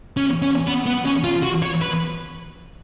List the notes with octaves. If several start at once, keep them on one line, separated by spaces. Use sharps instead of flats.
C#4
C#4
B3
B3
C#4
F4
F#4
C#5
B4